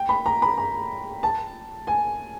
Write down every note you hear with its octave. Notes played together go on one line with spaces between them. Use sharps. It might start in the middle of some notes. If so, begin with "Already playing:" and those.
Already playing: G5
B5
A#5
B5
A#5
A5
G#5